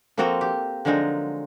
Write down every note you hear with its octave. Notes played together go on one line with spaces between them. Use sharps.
F3 A#3 C4 F#4 A4 A#4
G4
D3 F3 F#3 G#3 D#4 A#4